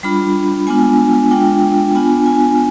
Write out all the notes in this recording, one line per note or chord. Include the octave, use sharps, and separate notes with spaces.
G3 D4 F4 B5
G#3 B3 D4 F4 G#5
G#3 D4 F4 G5
B3 D4 F4 G#5
G#5